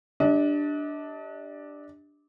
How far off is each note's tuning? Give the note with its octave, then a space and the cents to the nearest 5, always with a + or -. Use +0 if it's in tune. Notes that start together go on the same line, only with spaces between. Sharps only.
D4 +0 G4 +0 D#5 +40